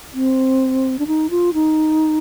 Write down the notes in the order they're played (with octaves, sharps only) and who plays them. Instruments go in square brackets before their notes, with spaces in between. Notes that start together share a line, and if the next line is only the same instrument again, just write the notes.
[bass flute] C4
D4
D#4
F4
D#4